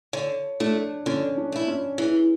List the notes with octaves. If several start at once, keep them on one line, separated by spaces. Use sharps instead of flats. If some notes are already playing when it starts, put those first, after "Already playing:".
D3 C#5
A3 D4 E4
D3 C#4
D4
A3 E4
C#4
E3 G#4